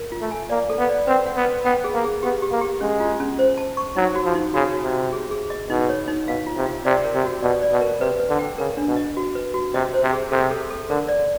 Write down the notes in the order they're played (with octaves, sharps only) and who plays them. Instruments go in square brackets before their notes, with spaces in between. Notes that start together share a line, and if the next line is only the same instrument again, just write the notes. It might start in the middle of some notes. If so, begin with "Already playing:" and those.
Already playing: [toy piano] A#4
F4
[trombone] A3
[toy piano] G#5
[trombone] A#3 [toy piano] D5
[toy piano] A4
[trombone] B3
[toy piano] D5
[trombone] C4 [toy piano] B4
[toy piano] F#5
[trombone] B3
[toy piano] B4
[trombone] B3 [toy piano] G5
[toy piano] G#4
[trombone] A#3
[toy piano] G#4
[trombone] B3 [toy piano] G4
[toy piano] G4
[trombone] A#3
[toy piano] G4
[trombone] G#3 [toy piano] C#4
[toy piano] F4
C#4
C5
A5
C#6
[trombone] F#3 [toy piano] D#4
[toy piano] F#4
[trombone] F3
[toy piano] D#4
[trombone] C#3 [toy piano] F#4
[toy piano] F#4
[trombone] C3
[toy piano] F#4
G#4
G#4
D#5
[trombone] B2 [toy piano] D#4
[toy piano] C#5
D#4
[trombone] B2 [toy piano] F5
[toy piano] F4
[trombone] C3
[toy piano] F4
[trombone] C3 [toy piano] D5
[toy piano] A#4
[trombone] C3
[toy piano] F#4
[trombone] B2 [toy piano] D5
[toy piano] D5
[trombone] B2
[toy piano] A#4
[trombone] C3 [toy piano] B4
[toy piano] B4
[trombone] D3
[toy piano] G5
[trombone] C#3 [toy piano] A#4
[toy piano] D4
[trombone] B2
[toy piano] D#5
F#4
B4
F#4
[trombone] C3 [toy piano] D#5
[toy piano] C5
[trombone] C3
[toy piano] G#4
[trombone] C3 [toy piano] A4
[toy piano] A4
A4
[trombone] D3 [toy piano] A#4
[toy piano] D5